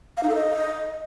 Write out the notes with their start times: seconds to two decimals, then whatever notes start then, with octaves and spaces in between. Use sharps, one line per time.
0.17 F5
0.23 D#4
0.29 A4
0.35 D#5